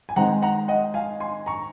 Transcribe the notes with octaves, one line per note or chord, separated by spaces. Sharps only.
G#5
D#3 G#3 C4 D#4 F#5 A#5
F#5 A#5
D#5 F#5
F5 G#5
G#5 C6
A#5 C#6